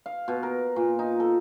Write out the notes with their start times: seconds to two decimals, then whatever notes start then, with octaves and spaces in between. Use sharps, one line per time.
0.06 F5
0.28 B2
0.43 A#4
0.76 A#2
0.99 D#4
1.20 A4